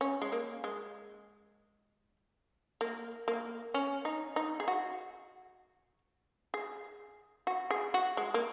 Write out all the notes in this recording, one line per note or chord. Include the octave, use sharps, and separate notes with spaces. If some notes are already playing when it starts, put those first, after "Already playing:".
C#4
G#3
A#3
G#3
A#3
A#3
C#4
D#4
D#4
G#4
F#4
G#4
F#4
G#4
F#4
G#3
A#3